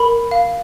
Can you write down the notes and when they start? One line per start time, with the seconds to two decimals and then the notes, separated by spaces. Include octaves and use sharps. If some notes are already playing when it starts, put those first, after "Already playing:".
Already playing: A#4 B5
0.31 F5